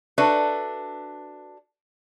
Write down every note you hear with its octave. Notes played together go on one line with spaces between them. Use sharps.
D4 F#4 A4 B4 E5